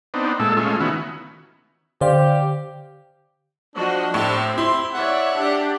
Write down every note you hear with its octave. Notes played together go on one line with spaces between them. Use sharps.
B3 C4 D4 D#4
A#2 G#3 A3 A4 E6
G#3 A3 C#4 F4
D#3 B3 C#4 E4 F#4
D3 G4 C5 D5 F5
F3 D4 F#4 D#5
A2 C4 G4
E4 C6
C#5 D5 E5 F#5
D4 G4